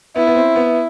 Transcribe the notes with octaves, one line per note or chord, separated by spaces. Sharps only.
B3 E4
B3
C4
B3